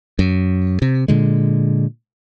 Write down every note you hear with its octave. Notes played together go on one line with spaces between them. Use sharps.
F#2
C3
A#2 D3 G#3